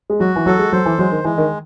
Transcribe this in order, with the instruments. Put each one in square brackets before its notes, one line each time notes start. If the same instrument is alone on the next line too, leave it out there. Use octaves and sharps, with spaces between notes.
[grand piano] G#3
[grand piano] F#3 [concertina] F#4
[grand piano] E3
[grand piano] F#3 [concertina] A4
[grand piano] G#3
[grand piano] F#3 [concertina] C5
[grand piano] E3
[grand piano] F#3 [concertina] G#3
[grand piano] D#3
[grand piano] E3 [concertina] G#3
[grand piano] D#3